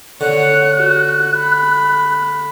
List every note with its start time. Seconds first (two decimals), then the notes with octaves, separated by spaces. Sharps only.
0.21 D3 C#5 F#5 F#6
0.76 F#4
1.37 B5